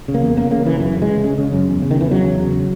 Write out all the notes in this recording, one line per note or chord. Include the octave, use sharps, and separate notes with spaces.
C#3
A#3
E2
C#3 A#3
C#3 A#3
C#3 E3
F#2 E3
C#3
G#3
C#3
C#3
C#3
F#2
E2
C#3
D#3
E2 E3
C#3 F#3
E2
C#3